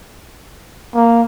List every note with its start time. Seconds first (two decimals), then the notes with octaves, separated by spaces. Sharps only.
0.94 A#3